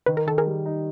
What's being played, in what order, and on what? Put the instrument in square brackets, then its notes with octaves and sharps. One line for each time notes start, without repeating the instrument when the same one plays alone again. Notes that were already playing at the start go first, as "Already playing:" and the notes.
[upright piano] D#3 [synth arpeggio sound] B4
[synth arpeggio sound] A#4
[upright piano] D#3 [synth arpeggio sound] A4
[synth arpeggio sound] G#4 A#4
[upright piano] G3
D#4